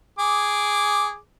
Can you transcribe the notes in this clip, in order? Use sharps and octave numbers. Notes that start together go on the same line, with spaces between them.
G#4 D6